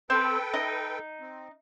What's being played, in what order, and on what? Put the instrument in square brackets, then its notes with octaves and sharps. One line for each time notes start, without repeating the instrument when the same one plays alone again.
[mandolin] C4 [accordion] A4 B4 G5
[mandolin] D#4
[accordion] C4